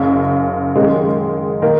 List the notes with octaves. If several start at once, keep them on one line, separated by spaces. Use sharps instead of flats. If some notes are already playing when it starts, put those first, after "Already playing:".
Already playing: F#1 F#2 C#3
F#1 F#2 D#3 G#3 D#4
D#3 A#3 D#4 A#4